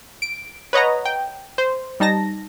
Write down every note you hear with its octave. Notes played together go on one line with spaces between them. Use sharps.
D7
B4 C#5 D#5 F#5 A#5
G5
C5
G3 D#4 A5 A#6